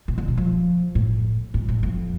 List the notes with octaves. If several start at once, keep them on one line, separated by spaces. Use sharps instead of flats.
C3
D3
B2
F3
A2
G#2
A2
F2